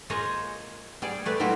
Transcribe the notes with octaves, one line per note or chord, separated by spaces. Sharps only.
G#3 A#3 F4 C5 C#5 D#5
G3 G#4 D5
A3 B4 D5
A#2 F#3 G3 A3 E4 F4